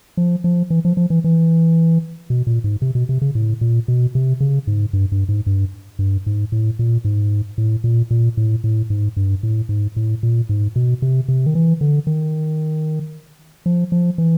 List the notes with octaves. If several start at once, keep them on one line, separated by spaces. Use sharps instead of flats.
F3
F3
E3
F3
F3
E3
E3
B2
A#2
G#2
C3
B2
C3
C#3
A2
A#2
B2
C3
C#3
G#2
G2
G2
G#2
G2
G2
G#2
A2
A#2
G#2
A2
A#2
A#2
A2
A2
G#2
G2
A2
G#2
A2
A#2
G#2
B2
C3
C3
D#3
E3
D3
D#3
F3
F3
E3